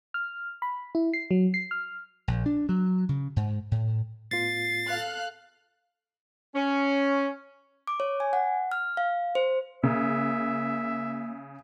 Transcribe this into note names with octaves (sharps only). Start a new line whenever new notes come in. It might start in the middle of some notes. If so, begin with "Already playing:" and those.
F6
B5
E4
C7
F#3
C7
F6
A#1
D4
F#3
C#3
G#2
A2
A2 B3 F4 A6 C7
A4 F5 F#6
C#4
D6
C#5
G#5
F#5
F6
F5
C5
C#3 A#3 E5